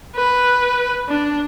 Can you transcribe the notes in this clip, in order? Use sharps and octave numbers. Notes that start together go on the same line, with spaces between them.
B4
D4